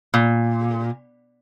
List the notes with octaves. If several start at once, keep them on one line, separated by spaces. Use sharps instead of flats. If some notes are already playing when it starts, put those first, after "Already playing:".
A#2